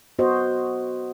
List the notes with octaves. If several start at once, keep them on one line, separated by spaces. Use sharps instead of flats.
B3 F#4 C5 D#5